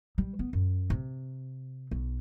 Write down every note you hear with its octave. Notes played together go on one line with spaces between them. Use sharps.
G3
B3
F#2
C3
B1